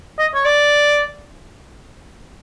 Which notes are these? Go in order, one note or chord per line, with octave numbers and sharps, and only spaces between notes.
D#5
C#5
D5